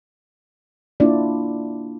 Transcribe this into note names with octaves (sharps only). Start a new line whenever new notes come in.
A#3 D4 E4 F4 D5